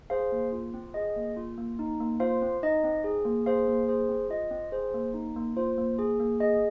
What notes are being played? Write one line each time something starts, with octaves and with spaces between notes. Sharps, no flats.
G#4 C5 F5
A#3
F4
C4
G#4 D#5
A#3
F4
A#3
D#4
A#3
F4 C5 F5
C4
D#4 D#5
C4
G#4
A#3
G#4 C5 F5
A#3
G#4 C5
C4
F4 D#5
C4
G#4 C5
A#3
D#4
A#3
F4 C5
A#3
G#4
A#3
G#4 D#5